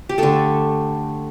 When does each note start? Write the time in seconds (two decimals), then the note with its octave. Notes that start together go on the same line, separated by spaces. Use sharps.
0.09 G4
0.18 D3 A3 A4